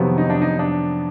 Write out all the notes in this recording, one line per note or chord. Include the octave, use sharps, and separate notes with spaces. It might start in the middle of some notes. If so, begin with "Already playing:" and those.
Already playing: F2 C3 D#3 F#3 B3
D#4
D4
D#4
D4